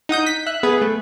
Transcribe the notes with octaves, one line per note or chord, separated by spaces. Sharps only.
D#4 F#5 D#6 G6
B6
E5 F#6
B3 G#4 B4
A3